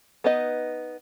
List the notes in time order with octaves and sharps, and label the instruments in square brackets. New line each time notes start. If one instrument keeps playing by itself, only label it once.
[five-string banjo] B3 D#4 B4 D#5